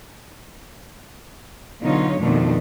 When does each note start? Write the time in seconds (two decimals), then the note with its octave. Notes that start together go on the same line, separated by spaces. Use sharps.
1.82 B2 D3 F#3 D#4 F4 C#5
2.20 F2 B2 D#3 A3 D4